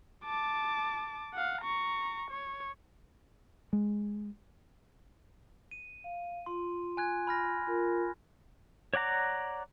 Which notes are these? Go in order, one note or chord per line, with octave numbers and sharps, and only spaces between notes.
A5 D6
F5 F#5
A#5 C#6
C#5
G#3
D#7
F5
F4 C6
G#5 F#6 G#6
B5 F6 A#6
F4 A#4
C#5 D5 F#5 A#5 D6